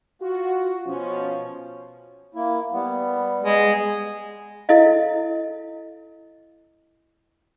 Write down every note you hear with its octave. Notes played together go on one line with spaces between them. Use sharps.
F4 F#4
B2 F3 C#4
A#3 E4
G3 B3
G#3
E4 A4 D#5 F5